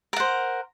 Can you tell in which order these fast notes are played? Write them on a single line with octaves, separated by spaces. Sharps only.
A#4 F#5 C5